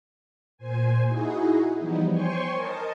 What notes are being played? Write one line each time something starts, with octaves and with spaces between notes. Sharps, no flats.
A#2 C5 G#5
D#4 E4 F#4 G#4
E3 F3 G3 B3 D#4
C5 C#5 G5 G#5 C6 C#6
A#4 D#5 A5